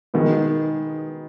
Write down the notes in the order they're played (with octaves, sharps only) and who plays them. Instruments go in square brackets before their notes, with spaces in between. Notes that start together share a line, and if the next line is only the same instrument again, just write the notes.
[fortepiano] B2 G#3 B3 D#4 [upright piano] D#3